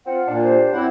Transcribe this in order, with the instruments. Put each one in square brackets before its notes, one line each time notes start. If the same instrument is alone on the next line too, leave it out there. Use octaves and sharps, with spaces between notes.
[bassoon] C4 [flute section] F4 F#5
[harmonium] A#2 [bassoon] D4
[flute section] G4 C5
[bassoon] F#2 [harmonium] C4 E4 F#5